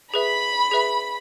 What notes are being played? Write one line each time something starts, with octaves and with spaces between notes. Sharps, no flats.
G#4 B4 E5 B5
G#4 B4 E5